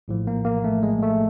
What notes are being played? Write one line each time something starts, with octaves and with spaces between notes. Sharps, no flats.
A#1 A2 F3
A#3
A#3
A3
G#3
A3